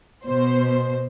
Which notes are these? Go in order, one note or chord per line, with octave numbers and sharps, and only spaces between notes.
B2 C5